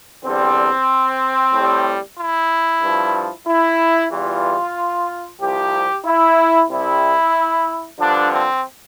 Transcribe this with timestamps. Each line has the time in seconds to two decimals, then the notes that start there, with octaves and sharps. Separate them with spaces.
0.24 E2 D3 G3 C4
1.53 A2 G3
2.18 E4
2.81 G2 F3
3.47 E4
4.11 E2 E3 G3 F4
5.41 C2 C3 F3 G4
6.05 E4
6.69 C2 C3 G3 E4
7.99 G2 D3 F3 D4
8.31 C4